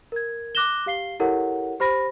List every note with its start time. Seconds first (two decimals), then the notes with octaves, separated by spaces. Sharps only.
0.12 A#4 G#6
0.55 D6 F#6 A#6 E7 G7
0.86 G4 F5 C7 G7
1.20 E4 G4 A4 A#4 C#5 F#5
1.80 G4 C5 B5 A#6